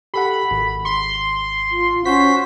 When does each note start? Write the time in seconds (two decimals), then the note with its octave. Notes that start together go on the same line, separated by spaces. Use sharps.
0.14 G4 A4 F#5 B5
0.51 G#1
0.85 C6
1.71 F4
2.05 C#4 F#4 C5 B6